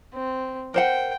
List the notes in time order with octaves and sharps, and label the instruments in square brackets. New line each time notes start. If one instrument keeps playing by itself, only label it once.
[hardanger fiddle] C4
[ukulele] A#4 C5 F#5 [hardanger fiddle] G5